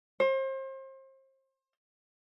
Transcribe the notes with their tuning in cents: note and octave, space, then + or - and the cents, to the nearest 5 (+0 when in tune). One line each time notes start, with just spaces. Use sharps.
C5 +35